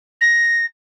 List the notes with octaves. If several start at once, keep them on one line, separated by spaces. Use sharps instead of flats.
A#6